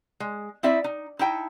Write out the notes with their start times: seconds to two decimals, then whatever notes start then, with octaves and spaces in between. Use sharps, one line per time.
0.20 G#3
0.63 C4 D#4 E4 D5 E5
0.84 D#4
1.19 D#4 E4 G5 A5